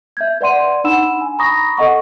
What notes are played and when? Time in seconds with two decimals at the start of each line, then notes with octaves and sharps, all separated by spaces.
0.17 E5 G6 G#6
0.41 B4 D5 F#5 C6 D#7
0.84 D4 D#4 F#5 B5 E6 E7
1.21 G#5
1.39 A#5 B5 C#6 D#6 A#6
1.77 A4 D#5 F#5 C#6